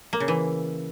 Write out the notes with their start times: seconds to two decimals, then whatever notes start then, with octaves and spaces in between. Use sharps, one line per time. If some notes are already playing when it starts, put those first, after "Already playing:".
0.13 A#3
0.20 C#3
0.28 E3